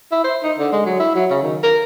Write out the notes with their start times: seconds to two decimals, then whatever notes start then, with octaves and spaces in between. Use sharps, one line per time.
0.12 E4
0.24 C5
0.44 D#4
0.58 D3
0.72 G#3
0.86 F#3
1.00 E4
1.15 F#3
1.31 C#3
1.43 D#3
1.63 A#4